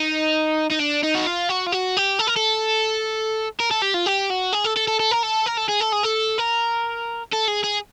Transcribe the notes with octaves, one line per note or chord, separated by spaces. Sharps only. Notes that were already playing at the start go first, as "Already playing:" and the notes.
Already playing: D#4
D#4
D4
D#4
F#4
F4
F#4
F4
F#4
G4
A4
A#4
A4
A#4
A4
G4
F4
G4
F#4
G#4
A4
A4
A4
A4
A#4
A4
A#4
A4
G#4
A4
G#4
A4
A#4
A4
G#4
G#4